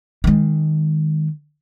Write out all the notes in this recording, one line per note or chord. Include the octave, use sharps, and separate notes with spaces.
D#3 G#3